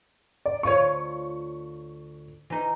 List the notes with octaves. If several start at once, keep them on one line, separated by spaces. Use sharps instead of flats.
D5
D2 F4 C#5 C#6
E3 D#4